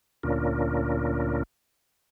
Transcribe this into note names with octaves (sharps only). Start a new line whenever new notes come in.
D2 A#2 C#4 D4 F4 A#4